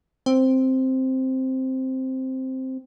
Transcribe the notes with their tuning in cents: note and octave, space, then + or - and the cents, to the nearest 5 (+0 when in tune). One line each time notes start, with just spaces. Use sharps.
C4 +0